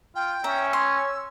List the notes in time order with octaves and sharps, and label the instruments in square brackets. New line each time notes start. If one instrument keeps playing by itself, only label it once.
[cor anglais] F4 [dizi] G5
[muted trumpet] C#4 [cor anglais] E5 [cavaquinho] A#5
[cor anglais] C#5 [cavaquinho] C6 [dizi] E6